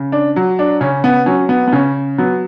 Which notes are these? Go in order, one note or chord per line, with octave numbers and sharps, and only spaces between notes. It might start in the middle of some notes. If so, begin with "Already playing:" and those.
Already playing: C#3
D4
F#3
D4
C#3 C#4
B3
F#3 C#4
B3
B3
C#3 C#4
F#3 B3